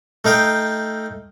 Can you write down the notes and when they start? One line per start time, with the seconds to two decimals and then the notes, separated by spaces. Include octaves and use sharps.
0.25 A3 D#4 F5 G5